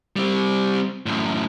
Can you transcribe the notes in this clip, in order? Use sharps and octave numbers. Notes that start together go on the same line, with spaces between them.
G3 C4
F#2 A2